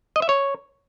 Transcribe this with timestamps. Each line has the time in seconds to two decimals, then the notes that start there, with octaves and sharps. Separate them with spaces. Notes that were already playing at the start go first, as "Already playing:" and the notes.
0.16 D#5
0.22 E5
0.29 C#5